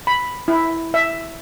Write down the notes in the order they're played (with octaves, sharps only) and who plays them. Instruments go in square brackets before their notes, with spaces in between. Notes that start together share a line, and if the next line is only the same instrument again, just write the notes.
[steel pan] B5
E4
E5